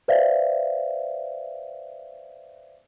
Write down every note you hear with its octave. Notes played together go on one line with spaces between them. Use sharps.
B4 C5 D5 E5 F5